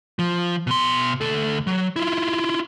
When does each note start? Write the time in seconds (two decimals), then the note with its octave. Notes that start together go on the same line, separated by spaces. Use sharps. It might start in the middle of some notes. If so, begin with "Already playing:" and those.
0.19 F3
0.67 B2 C6
1.21 D2 A4
1.67 F#3
1.96 E4 F4